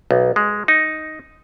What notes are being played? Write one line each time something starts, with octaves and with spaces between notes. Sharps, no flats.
B1
G#3
D#4